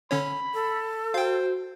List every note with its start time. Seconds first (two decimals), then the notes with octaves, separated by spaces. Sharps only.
0.11 D3 C#4 C#5 B5
0.54 A4
1.14 F#4 C5 F5 G5